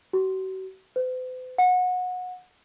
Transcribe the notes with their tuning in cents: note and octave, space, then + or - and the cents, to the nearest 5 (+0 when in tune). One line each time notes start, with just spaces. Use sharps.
F#4 +40
C5 -45
F#5 -25